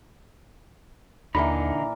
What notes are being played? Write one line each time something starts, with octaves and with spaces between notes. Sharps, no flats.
D#2 A#2 D3 E3 D#4 A#4 D5 B5